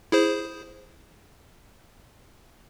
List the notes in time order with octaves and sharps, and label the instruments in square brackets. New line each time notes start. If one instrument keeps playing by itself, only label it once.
[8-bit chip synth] E4 G#4 C5